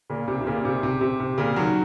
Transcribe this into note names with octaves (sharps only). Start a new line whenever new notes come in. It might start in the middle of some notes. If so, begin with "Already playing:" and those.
A#2 C#3
C3
C3
A#2 C#3
C3
C3
C3
C3
A#2 C#3
D#3 F#3